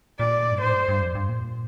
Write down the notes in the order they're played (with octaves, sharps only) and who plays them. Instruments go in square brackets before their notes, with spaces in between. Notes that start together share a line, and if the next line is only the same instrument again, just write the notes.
[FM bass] A#2 [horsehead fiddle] D5
[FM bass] G2
[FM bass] A2 [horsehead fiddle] C5
[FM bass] G2
G2
F2
G2
A#2